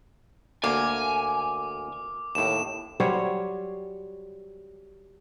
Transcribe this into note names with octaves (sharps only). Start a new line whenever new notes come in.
D2 A#3 G#5 D6
D#2 A2 E7
F#3 G3 C5 C#5